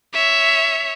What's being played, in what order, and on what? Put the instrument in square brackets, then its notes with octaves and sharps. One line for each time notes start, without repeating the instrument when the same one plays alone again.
[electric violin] C#5 E5